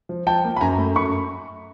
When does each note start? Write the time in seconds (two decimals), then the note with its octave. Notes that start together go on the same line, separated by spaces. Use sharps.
0.09 F3
0.26 F3 G5 A5
0.44 A#3
0.57 B5
0.61 F#2 G#5 A#5
0.78 A3
0.96 F#2 B5 C#6